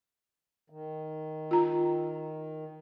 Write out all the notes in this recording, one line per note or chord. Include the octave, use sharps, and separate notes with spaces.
D#3
F4 A#5